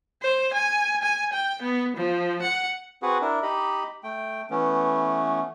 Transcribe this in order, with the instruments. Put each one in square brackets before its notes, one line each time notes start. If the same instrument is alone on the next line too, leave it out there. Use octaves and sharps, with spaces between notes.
[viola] C5
G#5
G#5
G5
B3
F3
F#5
[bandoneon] C4 F#4 G#4 B4 F#5
D4 E4 A#4
D#4 G4 D#5 B5
A3 G5
E3 A3 B3 C#4